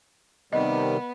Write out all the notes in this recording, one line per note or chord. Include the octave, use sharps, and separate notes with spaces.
C3 D#3 G3 B3 D#5